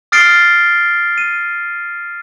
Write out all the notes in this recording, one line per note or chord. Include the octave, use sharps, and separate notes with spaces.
D#6 F6 A6 C7 D7 G7
D#7